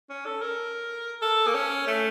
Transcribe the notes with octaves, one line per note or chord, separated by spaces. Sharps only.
C#4
A4
A#4
A4
A#3
C#4
A3